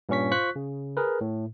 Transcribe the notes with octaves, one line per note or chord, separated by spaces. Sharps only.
G2 A#2 C#4 C#6 B6
F4 C5 C#6 F#6 B6
C#3
G#4 A#4 B4
A2